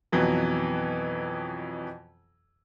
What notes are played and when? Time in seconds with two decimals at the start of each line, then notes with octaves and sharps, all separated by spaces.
0.12 F2 B2 E3 F#3